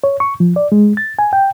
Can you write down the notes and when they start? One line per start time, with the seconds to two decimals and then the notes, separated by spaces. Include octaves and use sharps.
0.04 C#5
0.20 C#6
0.40 F3
0.56 D5
0.72 G#3
0.97 A6
1.19 G#5
1.33 G5